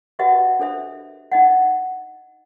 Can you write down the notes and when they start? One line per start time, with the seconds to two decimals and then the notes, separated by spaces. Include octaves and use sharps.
0.19 F#4 G4 B4 D#5 E5 F#5
0.59 D4 A4 C5 E5
1.32 D#4 D#5 F#5